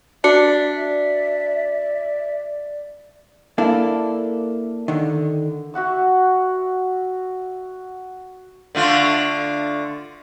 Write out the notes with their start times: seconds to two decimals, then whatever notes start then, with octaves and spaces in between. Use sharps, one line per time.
0.24 D4 F#4 D5 E5 C#7
3.58 A#3 D4 E4 A4
4.88 D3 D#3
5.74 F#4 E5 F#5 E6
8.75 D3 A3 F4